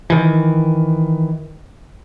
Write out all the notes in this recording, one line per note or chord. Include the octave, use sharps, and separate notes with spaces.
D#3 E3